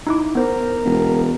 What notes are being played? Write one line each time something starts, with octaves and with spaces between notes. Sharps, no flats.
D#4 E4 D6
B3 A#4 C5
E1